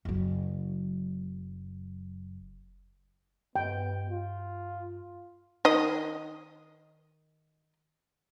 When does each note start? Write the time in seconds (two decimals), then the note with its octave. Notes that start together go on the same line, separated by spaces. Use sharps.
0.05 F#1 F#3
3.56 G2 B3 D#5 G5
4.10 F4
5.65 D#3 D#5